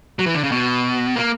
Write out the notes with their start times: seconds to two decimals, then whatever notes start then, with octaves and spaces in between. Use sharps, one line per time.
0.19 F#3
0.26 E3
0.35 D3
0.43 C#3
0.52 B2
1.16 A#3